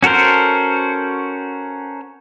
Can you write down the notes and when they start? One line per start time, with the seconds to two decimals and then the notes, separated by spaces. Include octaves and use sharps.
0.03 C#4 F#4 A4 A#4 C5